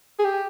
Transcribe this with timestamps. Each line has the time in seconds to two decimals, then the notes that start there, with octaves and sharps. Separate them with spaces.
0.19 G#4
0.24 G4